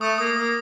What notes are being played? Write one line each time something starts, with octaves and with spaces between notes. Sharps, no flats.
A3 D#6
A#3 D#6
A#3 D#6